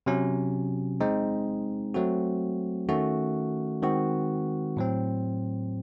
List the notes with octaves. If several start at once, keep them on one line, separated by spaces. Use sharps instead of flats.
C3 F#3 C#4
G#3 C4 D#4
F#3 A3 C4 F#4
D#3 A3 C#4 F#4
D#3 G#3 C4 F#4
A2 F#3 C4